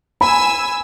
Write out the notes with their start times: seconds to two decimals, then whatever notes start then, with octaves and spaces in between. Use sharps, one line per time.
0.21 G#5 B5 E6